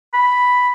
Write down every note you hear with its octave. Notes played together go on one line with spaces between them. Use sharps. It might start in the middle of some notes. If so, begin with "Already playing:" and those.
B5